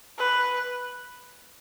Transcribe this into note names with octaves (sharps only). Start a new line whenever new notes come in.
B4